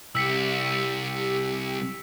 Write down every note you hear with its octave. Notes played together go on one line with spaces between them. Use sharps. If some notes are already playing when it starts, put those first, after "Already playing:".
C2 G4 E6 B6 C#7